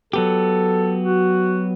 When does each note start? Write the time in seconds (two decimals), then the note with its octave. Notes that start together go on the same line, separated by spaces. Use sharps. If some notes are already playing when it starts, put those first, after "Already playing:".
0.13 F#3 B3 G4 A4
1.03 F#4